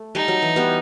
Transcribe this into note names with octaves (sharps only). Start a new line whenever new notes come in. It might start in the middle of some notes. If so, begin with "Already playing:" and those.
Already playing: A3
G3 D#4
F#3
E3
G3 B3